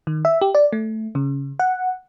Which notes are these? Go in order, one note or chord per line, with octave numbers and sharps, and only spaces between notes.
D#3
E5
G4
D5
A3
C#3
F#5